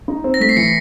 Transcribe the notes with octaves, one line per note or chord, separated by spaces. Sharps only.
D#4
C4
A#6
A3 B6
C7
E3 B6 C#7